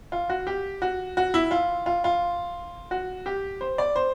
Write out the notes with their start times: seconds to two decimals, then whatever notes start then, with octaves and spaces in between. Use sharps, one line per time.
0.12 F4
0.30 F#4
0.47 G4
0.82 F#4
1.17 F#4
1.34 E4
1.51 F4
1.86 F4
2.04 F4
2.91 F#4
3.26 G4
3.61 C5
3.78 D5
3.96 C5